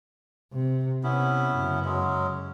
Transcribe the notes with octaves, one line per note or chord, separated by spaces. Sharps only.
C3
C3 B3 C#4 E4
F#2 C#3
F#3 G#3 C#4